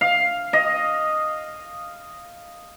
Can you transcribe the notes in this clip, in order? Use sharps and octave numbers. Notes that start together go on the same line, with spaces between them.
F5
D#5